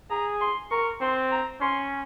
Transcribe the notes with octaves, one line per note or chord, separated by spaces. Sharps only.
G#4 A#5
C6
A#4 C#6
C4 C6
A#5
C#4 C6